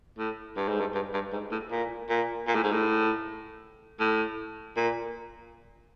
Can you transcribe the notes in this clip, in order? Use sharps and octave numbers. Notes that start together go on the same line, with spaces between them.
A2
G2
G#2
G2
G2
G2
G#2
A2
A#2
A#2
A#2
A2
G#2
A2
A2
A#2